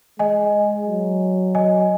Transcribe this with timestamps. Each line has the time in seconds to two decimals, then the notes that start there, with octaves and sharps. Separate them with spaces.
0.19 G#3 D#5 G#5
0.87 F#3
1.55 D#5 G#5